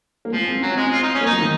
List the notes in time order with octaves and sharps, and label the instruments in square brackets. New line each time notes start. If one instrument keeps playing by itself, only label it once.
[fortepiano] A#3
[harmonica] F3 [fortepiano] G#3
[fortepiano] C4
[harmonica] F#3 [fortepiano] C#4
[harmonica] G#3 [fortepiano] C4
[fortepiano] C#4
[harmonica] F4
[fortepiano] C4 [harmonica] D#4
[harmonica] C#4
[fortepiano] A#3
[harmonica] D#4
[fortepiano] F#3
D#3